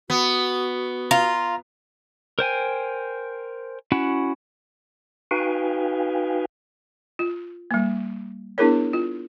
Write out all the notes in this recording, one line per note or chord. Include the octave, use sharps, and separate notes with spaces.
B3 F#4
F4 A#5
A#4 C5 G5 G#5
C#4 E4 F#4 F#5
D#4 F#4 B4 F5 G5 G#5
F4
G3 A#3
B3 D4 E4 G#4 A#4 C#5
F4